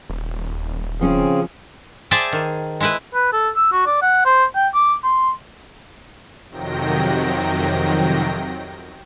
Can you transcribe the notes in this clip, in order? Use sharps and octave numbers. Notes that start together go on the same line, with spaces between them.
D#1
C#3 F3 C4 C#4 G#4
G#4 C5 D5 E5 G5 A5
D#3
G#3 E4 B4
B4
A4
E6
F#4
D5
F#5
C5
G5
D6
C6
F2 C3 D#3 F#3 G5 A#6